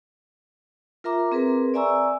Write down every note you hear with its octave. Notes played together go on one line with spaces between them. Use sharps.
F4 A#4 E5 A#5 D6
C4 G#4 A#4 B4
D5 E5 G#5 A#5 C#6 E6